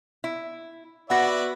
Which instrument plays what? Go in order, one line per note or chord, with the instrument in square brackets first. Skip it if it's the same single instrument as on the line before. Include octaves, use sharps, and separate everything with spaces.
[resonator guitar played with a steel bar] E4
[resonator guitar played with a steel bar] B3 F#4 [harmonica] B4 D5 E5 [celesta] F#5 A#6